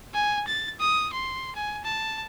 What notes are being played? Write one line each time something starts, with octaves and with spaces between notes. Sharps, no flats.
G#5
A6
D#6
C6
G#5
A5